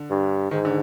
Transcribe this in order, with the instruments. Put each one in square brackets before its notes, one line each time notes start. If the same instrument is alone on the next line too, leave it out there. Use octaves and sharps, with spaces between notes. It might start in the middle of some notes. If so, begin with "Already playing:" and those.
Already playing: [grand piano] D3
[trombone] G2
[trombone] G#2 [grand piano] D#3
[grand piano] D3